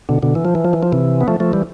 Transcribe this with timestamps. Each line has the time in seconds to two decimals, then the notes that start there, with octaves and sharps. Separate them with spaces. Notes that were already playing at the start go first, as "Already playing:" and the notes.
0.09 B2 D3
0.22 B2 D3
0.35 E3
0.45 F3
0.55 E3
0.65 F3
0.73 E3
0.83 F3
0.92 C3 E3
1.21 B3
1.28 F3 A3
1.40 F3 A3
1.53 E3 G3